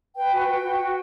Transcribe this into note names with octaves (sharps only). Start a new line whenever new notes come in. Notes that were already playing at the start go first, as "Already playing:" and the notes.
B4 G5
F#4 G#5
G5
F#4
F#4
F#4